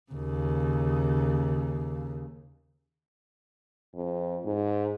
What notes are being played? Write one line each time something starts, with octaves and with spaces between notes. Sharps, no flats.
D#2 C#3
F2
G#2